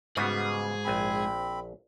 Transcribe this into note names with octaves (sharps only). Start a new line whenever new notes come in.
G#2 C#3 G3 B3 F#4 G#4
A#1 C4 G#5 B5